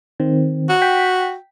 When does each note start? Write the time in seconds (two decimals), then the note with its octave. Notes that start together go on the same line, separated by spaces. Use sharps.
0.20 D#3 C4
0.69 F#4
0.82 G5 B6